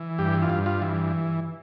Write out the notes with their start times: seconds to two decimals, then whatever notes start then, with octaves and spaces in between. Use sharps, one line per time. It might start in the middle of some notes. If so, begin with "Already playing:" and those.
Already playing: E3
0.18 G2 G4
0.42 F4
0.50 G2
0.66 F4
0.82 E3